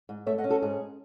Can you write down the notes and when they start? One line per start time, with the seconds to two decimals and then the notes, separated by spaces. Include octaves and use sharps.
0.09 G#2
0.26 A3 C#5 E5
0.38 D#5 F#5
0.44 C#4
0.50 F#4 A4
0.62 G#2 G#4